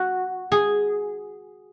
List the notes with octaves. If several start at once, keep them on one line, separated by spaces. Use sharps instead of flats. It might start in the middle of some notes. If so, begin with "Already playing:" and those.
Already playing: F#4
G#4